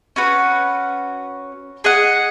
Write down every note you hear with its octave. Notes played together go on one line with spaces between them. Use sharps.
C#4 F#4 B4
G#4 D#5 F#5